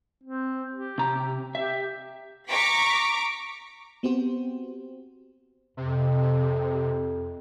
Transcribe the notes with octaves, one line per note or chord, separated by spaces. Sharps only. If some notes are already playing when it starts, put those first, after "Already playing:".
C4
G4
C3 A#5
G4 E5
A#5 C#6 D6 B6
B3 C4 F#4 G4 C5
F2 C3